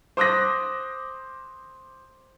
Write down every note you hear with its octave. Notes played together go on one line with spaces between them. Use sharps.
C5 D6 D#6 F#6 A#6